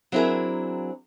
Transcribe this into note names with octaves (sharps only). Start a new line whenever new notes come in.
F#3 C4 D4 E4 G#4 A#4